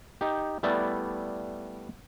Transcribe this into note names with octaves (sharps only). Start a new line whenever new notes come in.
D#4 G4
G3 A3 B3 E4 D5